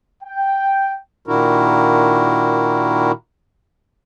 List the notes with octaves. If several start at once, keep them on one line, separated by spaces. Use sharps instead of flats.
G5
A#2 D#3 D4 E4 F#4 A#4